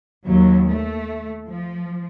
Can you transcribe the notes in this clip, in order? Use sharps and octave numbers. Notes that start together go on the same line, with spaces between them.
D#2 F#3
A3
F3